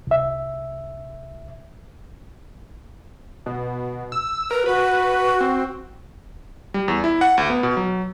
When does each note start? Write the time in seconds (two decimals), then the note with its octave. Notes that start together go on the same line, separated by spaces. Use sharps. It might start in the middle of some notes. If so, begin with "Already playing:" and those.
0.07 C2 E5
3.46 B2
4.12 E6
4.51 A#4 B4
4.66 F#4 B4
5.40 C4
6.74 G3
6.88 E2
7.04 E4
7.21 F#5
7.38 D2
7.50 B3
7.63 B2
7.77 F#3